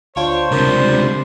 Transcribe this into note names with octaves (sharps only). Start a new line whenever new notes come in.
D2 D4 F4 C5 C#5
C#2 C3 F3 G3 D4 A#4